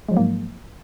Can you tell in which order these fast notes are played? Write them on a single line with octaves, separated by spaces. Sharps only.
G#3 F3 F#3 A#3 G#2